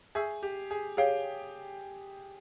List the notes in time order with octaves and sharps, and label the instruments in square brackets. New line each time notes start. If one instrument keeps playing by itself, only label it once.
[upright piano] G#4 [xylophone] E5 G#5 C#6 E6 G6
[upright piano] G4
G#4
[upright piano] G4 G5 [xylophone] G#4 C#5 F5